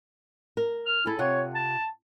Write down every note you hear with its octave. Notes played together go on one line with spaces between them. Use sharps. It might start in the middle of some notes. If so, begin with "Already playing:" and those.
A#4
F6
E4 G#4 A4
C3 F4 C#5 F#5
A5